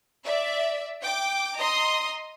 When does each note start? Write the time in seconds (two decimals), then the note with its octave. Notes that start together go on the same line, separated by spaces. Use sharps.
0.24 D5 E5
1.02 G5 D6
1.57 D#5 A#5 C6 D#6